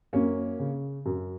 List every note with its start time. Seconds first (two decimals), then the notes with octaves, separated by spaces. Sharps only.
0.13 F#2 A#3 C#4
0.59 C#3
1.06 F#2